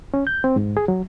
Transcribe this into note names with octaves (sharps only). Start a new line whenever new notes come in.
C#4
G6
C4
G#2
G#4
F#3